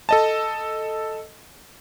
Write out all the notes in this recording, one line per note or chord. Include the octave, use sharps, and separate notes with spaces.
A4 D#5 A5